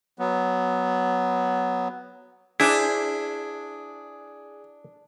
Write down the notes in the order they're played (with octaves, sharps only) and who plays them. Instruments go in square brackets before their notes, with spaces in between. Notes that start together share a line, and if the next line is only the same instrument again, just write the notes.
[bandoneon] F#3 B3
[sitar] D4 [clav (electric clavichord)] E4 [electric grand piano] G#4 [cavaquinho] C5 G#5 D6